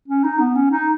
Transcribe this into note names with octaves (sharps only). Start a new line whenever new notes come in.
C#4
D#4
B3
C#4
D#4